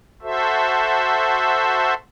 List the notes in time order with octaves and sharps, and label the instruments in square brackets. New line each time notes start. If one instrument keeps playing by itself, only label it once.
[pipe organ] F#4 A4 C5 E5